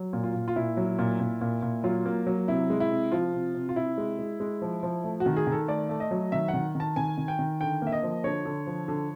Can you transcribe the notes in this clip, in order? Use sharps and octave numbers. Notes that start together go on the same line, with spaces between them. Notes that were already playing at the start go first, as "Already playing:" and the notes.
Already playing: F#3
A#2
F4
A#2
F4
A#2 E4
F#3
A#2
A#2
A#2
A#2
F#3 F4
A#3
F#3
C3 E4
G#3
E4
C3
F3 F4
C3
C3
F4
C3 E4
G#3
G#3
G#3
F3
F3
A3
F#4
D#3
G#4
D#3
A4
A3 D5
A3
D#5
F#3
D#3 E5
F#5
D#3
D#3
A5
D#3 G#5
D#3
G5
D#3
D3 G5
A#3 E5
D#5
F3
D3 C#5
D3
F3
D3